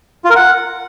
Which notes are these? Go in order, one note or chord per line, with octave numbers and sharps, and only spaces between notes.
F4
A#4
F#5